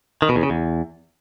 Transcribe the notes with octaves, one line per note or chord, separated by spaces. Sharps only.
D#3
B2
E2
C#3
E2